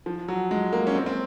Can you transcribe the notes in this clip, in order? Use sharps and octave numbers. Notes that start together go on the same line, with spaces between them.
F3
F#3
G#3
A#3
C#4
C4
C4